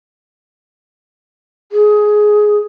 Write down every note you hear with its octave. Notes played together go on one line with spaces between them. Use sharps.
G#4